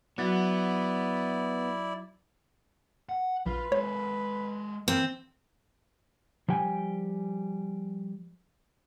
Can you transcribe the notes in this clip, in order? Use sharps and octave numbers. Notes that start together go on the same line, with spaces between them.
F#3 B3 E4 F#4 D5
F#5
A#1 F4 B4
G#3 A4 C#5
E3 A#3 C4
F3 G3 G5 G#5